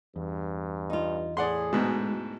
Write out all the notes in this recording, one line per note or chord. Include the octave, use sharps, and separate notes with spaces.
E2 G2
D#4 F4
A2 G#4 D5 F#5 C6
D2 G#2 B2 G#3